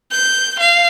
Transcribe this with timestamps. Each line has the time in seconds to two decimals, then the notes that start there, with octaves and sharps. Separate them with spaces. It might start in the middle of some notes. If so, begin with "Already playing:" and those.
0.12 G6
0.59 F5